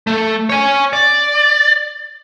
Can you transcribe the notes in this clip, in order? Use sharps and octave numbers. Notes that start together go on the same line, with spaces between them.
A3
C#5 G#5
D5